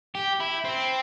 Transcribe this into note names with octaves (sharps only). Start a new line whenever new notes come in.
G4
E4
C4